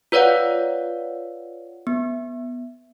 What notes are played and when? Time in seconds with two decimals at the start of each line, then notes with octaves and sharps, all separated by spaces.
0.12 F4 B4 C#5 D5 F5 F#5
1.87 B3